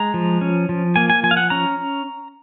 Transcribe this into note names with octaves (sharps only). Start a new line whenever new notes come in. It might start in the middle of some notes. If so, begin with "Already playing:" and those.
Already playing: G#3 A#5
F3
C#4
F3
A#3 G#5
G#5
F3 G#5
F5
F#5
C#4 A#5